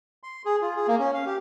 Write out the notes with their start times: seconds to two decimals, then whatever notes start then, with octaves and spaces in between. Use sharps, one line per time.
0.23 C6
0.45 G#4
0.62 F4
0.76 G#4
0.88 A#3
0.99 C#4
1.14 F5
1.26 G4